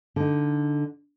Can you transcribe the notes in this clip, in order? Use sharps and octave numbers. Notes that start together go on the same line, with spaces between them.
D3 D#4